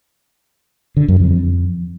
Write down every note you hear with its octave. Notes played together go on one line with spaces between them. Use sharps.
D3
F#2
F2